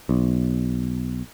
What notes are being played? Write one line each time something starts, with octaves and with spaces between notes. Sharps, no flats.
B1